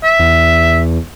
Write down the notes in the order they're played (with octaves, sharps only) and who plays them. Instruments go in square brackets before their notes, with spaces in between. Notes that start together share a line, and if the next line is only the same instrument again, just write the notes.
[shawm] E5
[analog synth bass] E2